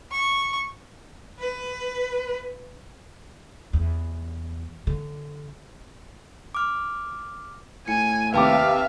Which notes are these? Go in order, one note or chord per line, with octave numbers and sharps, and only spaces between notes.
C#6
B4
E2
D3
D6 F6
A2 G#5 C#7
D#2 C3 B4 E5 F5 G5 A5 D6